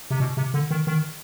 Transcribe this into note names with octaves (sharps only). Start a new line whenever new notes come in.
C3
B2
C3
D3
D#3
D#3